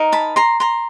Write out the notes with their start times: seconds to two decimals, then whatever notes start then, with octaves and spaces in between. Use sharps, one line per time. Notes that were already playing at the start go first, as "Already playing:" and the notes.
Already playing: D#4 A#4
0.12 A5 B5
0.36 A#5 C6
0.60 A#5 C6